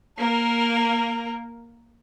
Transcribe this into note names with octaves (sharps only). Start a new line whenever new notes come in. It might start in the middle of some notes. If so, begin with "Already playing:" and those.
A#3 A#4